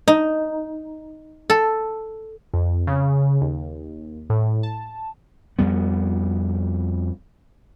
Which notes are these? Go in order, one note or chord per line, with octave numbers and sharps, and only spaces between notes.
D#4
A4
F2
C#3
D#2
A2
A5
F2 G3 B3